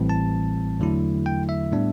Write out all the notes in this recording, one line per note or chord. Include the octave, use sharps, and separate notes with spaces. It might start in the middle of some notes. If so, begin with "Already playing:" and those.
Already playing: A1 A2 E3 G3 C4
A5
E2 D3 F#3 A3 E4
G5
E5
A2 G3 B3 D4